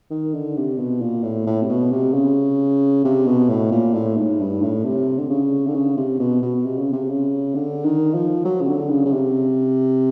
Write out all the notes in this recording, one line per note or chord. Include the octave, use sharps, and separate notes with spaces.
D#3
D3
C3
B2
A#2
A2
A2
C3
B2
C3
C#3
C3
B2
A2
A#2
A2
G#2
G2
A2
C3
D3
C#3
D3
C#3
C3
B2
B2
C3
C#3
C3
C#3
D3
D#3
F3
F#3
C#3
D3
C#3
C#3
C3